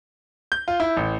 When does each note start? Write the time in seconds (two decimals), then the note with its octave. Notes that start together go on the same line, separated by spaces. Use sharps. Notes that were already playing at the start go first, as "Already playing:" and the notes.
0.52 G6
0.68 F4
0.80 E4
0.97 A1